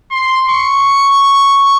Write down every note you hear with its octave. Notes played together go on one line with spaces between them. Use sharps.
C6
C#6